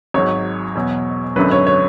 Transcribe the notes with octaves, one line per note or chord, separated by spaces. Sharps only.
G#1 G#2 F#3 C#5
E2 B2 F#3
G#1 F#2 D3 F#3 B4
C#5
C#5